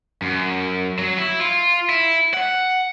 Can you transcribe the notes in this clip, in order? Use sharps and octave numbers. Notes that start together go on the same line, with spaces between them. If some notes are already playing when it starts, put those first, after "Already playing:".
F#2
F#3
E4
F4
E4
F#5